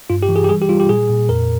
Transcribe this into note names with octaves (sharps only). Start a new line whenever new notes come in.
G2 F4
G4
E3
G#4
G4
G3 G#4
G4
G3 F4
G4
A#2 G#4
A#2
F2 A#4